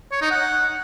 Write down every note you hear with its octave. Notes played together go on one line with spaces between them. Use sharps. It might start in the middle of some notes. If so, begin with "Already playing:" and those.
C#5
D#4
F#5